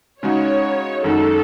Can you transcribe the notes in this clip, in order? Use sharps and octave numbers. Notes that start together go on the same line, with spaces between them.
C#3 G#3 D#4 F#4 C#5
F#2 D#3 G#3 D#4 F#4 A4